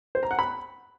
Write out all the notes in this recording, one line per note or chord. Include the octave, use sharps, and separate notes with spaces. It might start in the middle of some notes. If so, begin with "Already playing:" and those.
C5
A#5
F#5
B5